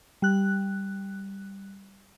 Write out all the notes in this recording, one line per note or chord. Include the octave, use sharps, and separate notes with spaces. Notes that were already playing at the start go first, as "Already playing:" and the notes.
G3 F#6